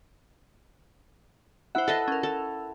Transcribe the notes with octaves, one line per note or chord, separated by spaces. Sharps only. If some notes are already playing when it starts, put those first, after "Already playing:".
E4 C5 E5 F#5
A4 B4 D#5 E5 A6
C#4 A#4
A4